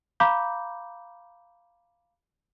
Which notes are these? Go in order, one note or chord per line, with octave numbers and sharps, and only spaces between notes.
F5 A#5 B5 D6 G6